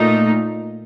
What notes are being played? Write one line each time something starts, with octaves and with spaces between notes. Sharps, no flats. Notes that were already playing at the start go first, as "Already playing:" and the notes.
Already playing: A#2 A3 D#4